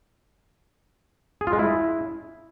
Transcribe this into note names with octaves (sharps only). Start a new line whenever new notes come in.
G#4
F4
G#3
E4